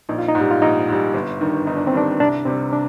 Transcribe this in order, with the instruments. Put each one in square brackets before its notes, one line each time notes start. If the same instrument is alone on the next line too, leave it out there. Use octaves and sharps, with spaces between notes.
[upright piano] A#1 [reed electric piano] D#4
[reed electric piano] F4
D#4
[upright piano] G#2 G3
[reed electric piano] F4
[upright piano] A#1 [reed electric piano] D#4
[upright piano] G#2 G3
G1
G2 D#3
[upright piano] G1 [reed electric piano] D#4
[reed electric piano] D4
C4
[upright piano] G2 D#3 [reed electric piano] D4
[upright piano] C2 [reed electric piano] D4
[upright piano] C3 G3 [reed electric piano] C4
[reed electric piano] D4